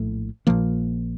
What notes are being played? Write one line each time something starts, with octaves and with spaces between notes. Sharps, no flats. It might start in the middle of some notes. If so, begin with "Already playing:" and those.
Already playing: A#1 A2 A3
A#1 A#2 F3 A#3